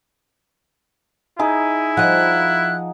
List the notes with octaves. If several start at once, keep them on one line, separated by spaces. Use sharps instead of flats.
D#4 E4 G#4
F3 D#5 F#5 F#6